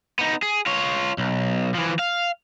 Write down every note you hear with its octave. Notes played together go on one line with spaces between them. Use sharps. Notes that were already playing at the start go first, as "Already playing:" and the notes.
B3 D#4
G#4
F4 C#5
B1
E3 F3
F5